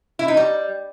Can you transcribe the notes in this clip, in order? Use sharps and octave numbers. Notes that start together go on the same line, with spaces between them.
E4
D#4
G3